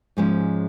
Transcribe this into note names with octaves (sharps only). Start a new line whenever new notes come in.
G#2 F3 G#3 C#4